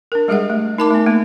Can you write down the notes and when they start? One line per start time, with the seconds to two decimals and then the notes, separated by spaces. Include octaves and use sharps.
0.12 D4 A#4
0.28 G3 G#3 G4 G#4 E5 F#5
0.50 A3
0.78 D#4 A#4 A5 B5 D6
0.91 A3 B3
1.06 A3 A#3